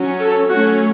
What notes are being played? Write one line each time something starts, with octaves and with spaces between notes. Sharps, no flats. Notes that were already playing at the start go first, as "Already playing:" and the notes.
Already playing: F#3 C#4
A4
F#3 A3 C#4 F#4